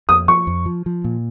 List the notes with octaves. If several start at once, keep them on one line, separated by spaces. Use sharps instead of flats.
F2 D#6
F3 C#6
F2
F3
F3
A#2